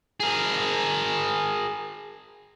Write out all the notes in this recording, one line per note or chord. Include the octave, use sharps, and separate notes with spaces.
G#4 A#4